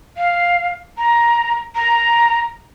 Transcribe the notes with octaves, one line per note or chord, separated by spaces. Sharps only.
F5
A#5
A#5